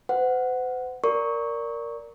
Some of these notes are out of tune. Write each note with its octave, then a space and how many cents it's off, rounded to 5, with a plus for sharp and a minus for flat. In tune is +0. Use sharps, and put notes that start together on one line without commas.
C5 -45 F#5 +0
A#4 +0 D5 -10 C#6 +0